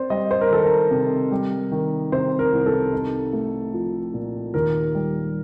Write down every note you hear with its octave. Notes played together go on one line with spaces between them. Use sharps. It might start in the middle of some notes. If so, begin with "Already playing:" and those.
Already playing: C4 C5 D5
G3 D#5
C5
A#4
D#3 A4
A#4
C3
G3
D#3
C3 C5
A#4
C2
A4
D#4
A3
F3
A#2
D#2 A#4
G3